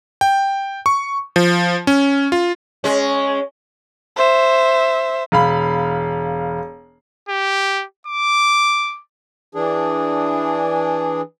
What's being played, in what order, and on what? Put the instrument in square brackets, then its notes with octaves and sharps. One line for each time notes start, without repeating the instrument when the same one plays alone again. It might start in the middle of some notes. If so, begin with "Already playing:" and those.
[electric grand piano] G5
C#6
F3
C#4
F4
[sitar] G#3 C#4
[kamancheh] C5 E5
[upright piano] E1 F5 B5
[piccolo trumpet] G4
D6
[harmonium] E3 D4 G#4